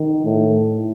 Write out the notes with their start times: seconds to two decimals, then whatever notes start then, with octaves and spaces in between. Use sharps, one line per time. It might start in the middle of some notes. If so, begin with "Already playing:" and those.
Already playing: D#3
0.25 A2